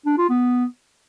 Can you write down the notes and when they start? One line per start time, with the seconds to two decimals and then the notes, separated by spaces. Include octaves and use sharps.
0.06 D4
0.18 F4
0.29 B3